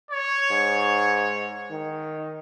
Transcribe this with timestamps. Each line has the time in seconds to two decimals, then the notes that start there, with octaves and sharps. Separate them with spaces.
0.11 C#5
0.51 G#2
1.71 D#3